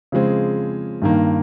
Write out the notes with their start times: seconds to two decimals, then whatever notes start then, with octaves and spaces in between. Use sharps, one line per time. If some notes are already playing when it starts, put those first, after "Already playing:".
0.12 C#3 F3 G#3 C4
1.02 G2 D#3 A#3